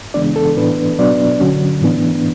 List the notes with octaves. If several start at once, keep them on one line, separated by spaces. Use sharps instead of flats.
C#3 E3 G#3 B3 D4 D5
A4
A2 E3 B3 D4 B4
B2 F#3 B3 D4 D5
D3 F#3 C#4
A2 E3 B3 D4